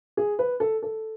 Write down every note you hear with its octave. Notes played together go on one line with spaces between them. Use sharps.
G#4
B4
A4
A4